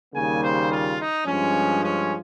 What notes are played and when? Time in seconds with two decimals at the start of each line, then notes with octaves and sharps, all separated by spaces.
0.14 D#2 C#3 G3 A#3 G#5
0.42 C5
0.71 F4
0.99 D#4
1.27 G2 F3 G#3 C#4
1.84 C#4